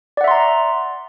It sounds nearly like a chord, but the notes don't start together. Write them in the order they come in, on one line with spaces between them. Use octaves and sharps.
D5 F#5 E5 C6 A#5